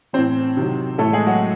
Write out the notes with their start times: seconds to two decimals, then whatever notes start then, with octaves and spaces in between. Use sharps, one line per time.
0.13 A2 E3 C4 C5
0.57 C3 D#3 F#3
0.98 A2 E3 A3 A4
1.12 G#3 G#4
1.26 F#3 F#4